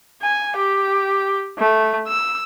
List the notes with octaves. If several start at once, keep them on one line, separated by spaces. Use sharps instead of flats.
G#5
G4
A3
E6